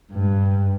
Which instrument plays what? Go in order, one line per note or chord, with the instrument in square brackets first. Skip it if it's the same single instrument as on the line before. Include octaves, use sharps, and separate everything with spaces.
[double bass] G2